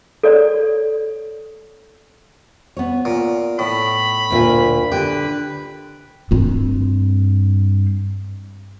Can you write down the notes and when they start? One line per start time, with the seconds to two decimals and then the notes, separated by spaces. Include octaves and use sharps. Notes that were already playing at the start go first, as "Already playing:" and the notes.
0.23 A4 C#5 D5
2.77 B3 C#5
3.05 A#2
3.59 A2 B5
4.30 D2 A#2 E5
4.92 D3 G4 B4
6.31 G2 C4